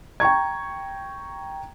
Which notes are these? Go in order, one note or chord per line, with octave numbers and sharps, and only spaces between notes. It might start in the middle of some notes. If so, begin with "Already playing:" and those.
G5 A#5 C#6 G#6